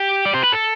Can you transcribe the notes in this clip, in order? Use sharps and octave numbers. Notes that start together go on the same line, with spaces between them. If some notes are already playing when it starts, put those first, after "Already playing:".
Already playing: G4
D5
C5
B4
A4